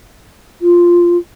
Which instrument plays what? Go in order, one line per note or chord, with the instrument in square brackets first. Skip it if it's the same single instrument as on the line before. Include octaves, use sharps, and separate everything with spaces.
[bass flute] F4